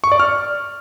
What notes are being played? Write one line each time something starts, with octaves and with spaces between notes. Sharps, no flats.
C#6
D5
F6